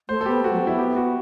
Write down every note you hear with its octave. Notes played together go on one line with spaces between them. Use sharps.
A3 C5
A4
B3 G4
A3 F#4
F#3
C4
B3 E4
G4
F#4